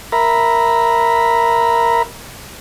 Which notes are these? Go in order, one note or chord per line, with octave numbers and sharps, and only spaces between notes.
A#4 E5 A#5 B5